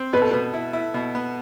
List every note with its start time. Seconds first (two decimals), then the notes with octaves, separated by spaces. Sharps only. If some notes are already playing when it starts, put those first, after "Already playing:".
Already playing: C4
0.13 B2 B4
0.22 A4
0.31 B2 B4
0.54 E4
0.73 E4
0.94 B2
1.15 B3